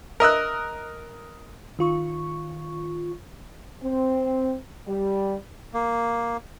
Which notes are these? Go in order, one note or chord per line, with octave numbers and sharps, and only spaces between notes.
A#4 D#5 E6 F#6
D#3 F4 C#6
C4
G3
A#3